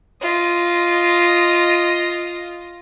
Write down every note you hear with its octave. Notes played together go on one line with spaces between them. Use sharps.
F4 D#5